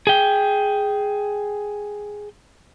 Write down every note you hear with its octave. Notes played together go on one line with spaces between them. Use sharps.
G#4 G5